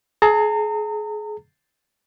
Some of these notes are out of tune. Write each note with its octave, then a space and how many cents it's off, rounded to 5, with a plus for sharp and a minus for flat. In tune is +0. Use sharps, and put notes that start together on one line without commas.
G#4 +30 A#5 -35